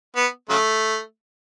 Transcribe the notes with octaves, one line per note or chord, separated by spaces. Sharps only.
B3
C#3 F#3 A3